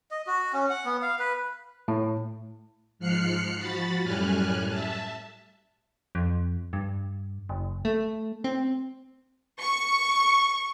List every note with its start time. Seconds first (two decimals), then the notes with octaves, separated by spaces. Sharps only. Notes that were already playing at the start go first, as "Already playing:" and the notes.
0.11 D#5
0.27 F#4
0.53 C#4
0.70 F#5
0.85 B3
1.02 F5
1.19 B4
1.88 A2
2.99 G#2 F3 F6 F#6 C7 C#7
3.56 F3 F#4 B5 A6
4.03 F#2 A2 G3 G#5 F6 F#6
4.68 E5 A5
6.15 F2
6.73 G2
7.49 F#1
7.85 A3
8.44 C4
9.60 C#6